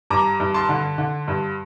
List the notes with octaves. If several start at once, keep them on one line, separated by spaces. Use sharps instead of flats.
G2 A#5 D6
G2
A5 C6
D3
D3
G2